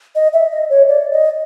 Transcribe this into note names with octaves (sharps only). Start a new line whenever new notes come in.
D#5
E5
D#5
C#5
D5
D#5